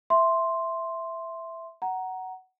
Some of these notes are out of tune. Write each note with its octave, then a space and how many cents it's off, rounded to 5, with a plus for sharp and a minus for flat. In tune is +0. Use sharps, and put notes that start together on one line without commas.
E5 +0 C6 +0
F#5 +15 A#5 +0